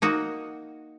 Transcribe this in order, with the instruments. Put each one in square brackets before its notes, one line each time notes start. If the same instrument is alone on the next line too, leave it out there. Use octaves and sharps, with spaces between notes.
[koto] A#3 D#4 F#4